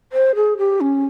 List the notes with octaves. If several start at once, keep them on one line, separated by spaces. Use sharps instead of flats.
C5
G#4
G4
C#4